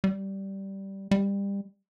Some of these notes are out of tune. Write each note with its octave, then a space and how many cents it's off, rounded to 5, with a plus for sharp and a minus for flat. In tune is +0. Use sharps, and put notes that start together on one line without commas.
G3 -10
G3 +25